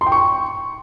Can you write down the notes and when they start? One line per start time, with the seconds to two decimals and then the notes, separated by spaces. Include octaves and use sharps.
0.01 C6
0.06 G5
0.12 C#6